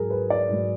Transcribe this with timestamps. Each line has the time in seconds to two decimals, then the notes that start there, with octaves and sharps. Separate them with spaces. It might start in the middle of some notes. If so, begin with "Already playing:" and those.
Already playing: G#2 F#3 G#4 A#4
0.10 B4
0.30 D5
0.49 G#2 F#3